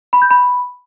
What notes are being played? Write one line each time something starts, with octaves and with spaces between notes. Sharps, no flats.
B5
G6
B5